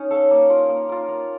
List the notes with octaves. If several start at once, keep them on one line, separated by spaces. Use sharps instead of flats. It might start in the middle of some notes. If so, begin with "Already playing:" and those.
Already playing: C#4 D#4
A4 C#5 F5
A#3
F4 A#4
A#3
F4 A#4
A#3